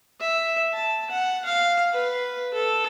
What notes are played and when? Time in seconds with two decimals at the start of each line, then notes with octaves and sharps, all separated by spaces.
0.20 E5
0.74 A5
1.10 F#5
1.45 F5
1.93 B4
2.54 A4